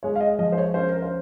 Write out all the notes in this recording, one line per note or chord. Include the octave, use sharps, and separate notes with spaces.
G#3 C#5
F5
D#5
F3 D#5
C5
C#5
C#4 C5
A#4
C5